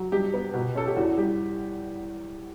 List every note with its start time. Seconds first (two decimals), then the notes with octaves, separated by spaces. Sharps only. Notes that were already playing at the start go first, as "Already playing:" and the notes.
Already playing: F#3
0.12 G2 G4
0.34 B3
0.54 B2
0.75 C#4 A4
0.87 G4
0.97 E2 F#4
1.18 G3 G4